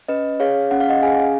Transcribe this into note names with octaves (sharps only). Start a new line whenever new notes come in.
C#4 B4 D#5
G#4 C#5 F5
C#4 F#5
F5
D#5 F#5
G#4 F5 G#5